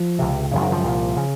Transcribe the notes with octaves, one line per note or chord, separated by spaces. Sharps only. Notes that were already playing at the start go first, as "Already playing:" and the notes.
Already playing: F3
C#2 C3
G#1 F#2 C#3
D#3
F3
C2 A#2
C#3